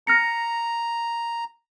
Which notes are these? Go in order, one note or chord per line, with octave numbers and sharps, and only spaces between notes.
A#5 F6 A#6 C#7